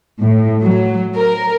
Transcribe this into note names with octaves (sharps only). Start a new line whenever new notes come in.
A2
F#3
A#4